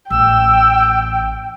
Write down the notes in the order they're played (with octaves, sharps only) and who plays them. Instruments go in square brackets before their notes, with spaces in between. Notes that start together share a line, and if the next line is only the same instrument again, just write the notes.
[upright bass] A1 [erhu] G5 [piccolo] E6